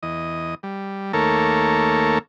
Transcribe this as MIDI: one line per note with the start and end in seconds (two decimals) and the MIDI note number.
0.03 0.55 40
0.03 0.55 75
0.63 1.12 55
1.13 2.19 39
1.13 2.19 57
1.13 2.19 58
1.13 2.19 69
1.13 2.19 70
1.13 2.19 73